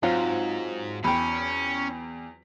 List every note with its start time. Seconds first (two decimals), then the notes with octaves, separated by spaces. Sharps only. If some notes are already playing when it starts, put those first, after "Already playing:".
0.03 G#2 F#3 C4 F4
1.04 E2 C#4 G5 B5